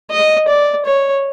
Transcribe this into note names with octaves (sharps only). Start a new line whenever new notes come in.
D#5
D5
C#5